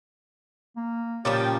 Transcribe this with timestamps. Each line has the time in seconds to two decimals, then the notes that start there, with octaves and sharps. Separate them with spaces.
0.76 A#3
1.25 A#2 C#3 F3 G3 G4 G5 A6